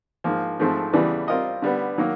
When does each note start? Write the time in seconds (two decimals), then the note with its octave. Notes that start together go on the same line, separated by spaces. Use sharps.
0.24 G#2 F3 A#3
0.59 G#2 F3 A3 C4
0.93 E2 C#3 E3 G3
1.28 G3 C4 F4 A#4 D#5
1.62 D3 G3 B3
1.98 D#3 F#3 A#3